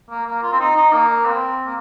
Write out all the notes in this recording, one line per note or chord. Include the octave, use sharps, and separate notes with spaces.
A#3
A#3
F4
C4
D#4
D#4
A#3
C4
A#3